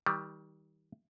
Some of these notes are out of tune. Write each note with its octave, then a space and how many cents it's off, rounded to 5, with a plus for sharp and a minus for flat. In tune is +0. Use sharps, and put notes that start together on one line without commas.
D#3 +35 G3 +0